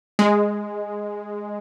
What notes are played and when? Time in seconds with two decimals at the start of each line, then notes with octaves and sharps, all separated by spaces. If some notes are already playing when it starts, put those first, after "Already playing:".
0.19 G#3